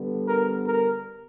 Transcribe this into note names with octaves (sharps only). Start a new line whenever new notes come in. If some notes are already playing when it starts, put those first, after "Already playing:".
Already playing: D3 G3 B3
A#4
A#4